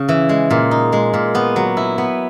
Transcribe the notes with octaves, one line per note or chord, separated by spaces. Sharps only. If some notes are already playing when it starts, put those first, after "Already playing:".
Already playing: C#3
E3
G#3
A#2
D#4
G#3
A#2
B3
F#3
E4
B3